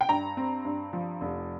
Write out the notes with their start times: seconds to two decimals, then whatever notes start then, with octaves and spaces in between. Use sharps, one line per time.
0.01 G5
0.09 G2 A#5
0.37 C4
0.65 G2
0.93 F3
1.21 F1